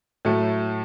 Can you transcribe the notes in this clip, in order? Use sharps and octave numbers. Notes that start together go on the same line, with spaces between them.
A2 F#3 A3